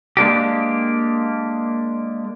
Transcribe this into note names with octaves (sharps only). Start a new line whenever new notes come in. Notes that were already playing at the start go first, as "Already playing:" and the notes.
G#3 A#3 D4 G4